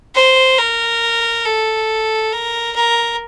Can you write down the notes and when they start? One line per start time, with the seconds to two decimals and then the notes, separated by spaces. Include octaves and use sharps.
0.15 C5
0.59 A#4
1.46 A4
2.33 A#4
2.76 A#4